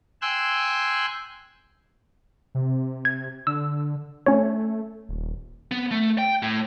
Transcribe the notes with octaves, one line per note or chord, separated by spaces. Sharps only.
G5 G#5 C6 E6 F#6
C3
G#6
D3 E6
A3 C#4 C#5
D#1
B3
A3
G5
A2